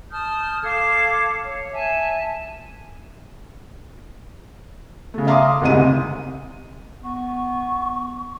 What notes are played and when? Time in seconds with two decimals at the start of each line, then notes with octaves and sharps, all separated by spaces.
0.11 A5 D#6 F6 G6
0.64 A4 F5 D6 G#6
1.43 C#5
1.72 E5 G#5 A5
5.14 C#3 A3
5.27 E5 F5 A#5 C6 D6 D#6
5.61 F#1 D2 G#2 C3 D#5 D#7
7.04 B3 C#6